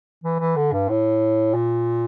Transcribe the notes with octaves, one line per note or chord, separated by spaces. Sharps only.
E3
E3
D3
G2
A2
A#2